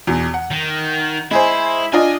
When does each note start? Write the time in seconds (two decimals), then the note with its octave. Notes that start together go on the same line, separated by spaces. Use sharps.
0.07 E2 B2
0.34 F#5
0.51 D#3
1.31 G#3 E4 G#4 C5
1.93 D4 F4 D#5 G#5